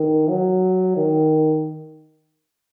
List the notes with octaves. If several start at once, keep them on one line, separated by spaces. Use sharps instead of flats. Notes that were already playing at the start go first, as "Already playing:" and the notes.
Already playing: D#3
F#3
D#3